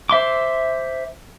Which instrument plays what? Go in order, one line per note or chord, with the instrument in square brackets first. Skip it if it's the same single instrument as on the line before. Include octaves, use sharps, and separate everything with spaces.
[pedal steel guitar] C5 E5 C6 D6